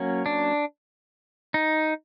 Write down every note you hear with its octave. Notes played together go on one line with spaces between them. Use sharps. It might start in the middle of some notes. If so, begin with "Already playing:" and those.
Already playing: F#3 A#3 C#4
D4
D#4